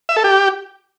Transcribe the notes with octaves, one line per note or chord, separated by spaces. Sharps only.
E5
A4
G4